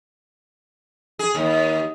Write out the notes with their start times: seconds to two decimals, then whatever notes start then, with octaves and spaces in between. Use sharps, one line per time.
1.19 G#4
1.35 D#2